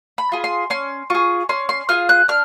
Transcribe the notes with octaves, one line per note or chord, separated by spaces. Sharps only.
B5
F4 G#4
C6
C#4 C6
F4 G#4 C#6
C#4 C6
C6
F4 G#4 F6
F#6
D4 F6